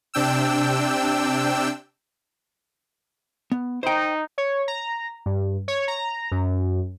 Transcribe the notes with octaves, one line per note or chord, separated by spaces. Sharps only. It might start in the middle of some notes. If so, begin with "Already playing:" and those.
C3 D4 G5 E6
B3
D#4 C5 G5
C#5
A#5
G2
C#5
A#5
F#2